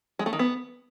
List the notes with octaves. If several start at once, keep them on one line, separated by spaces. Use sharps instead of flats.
G#3
A3
D#3
B3